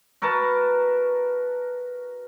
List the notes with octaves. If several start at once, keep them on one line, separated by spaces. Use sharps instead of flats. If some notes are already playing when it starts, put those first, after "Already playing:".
F#4 A#4 B4 A5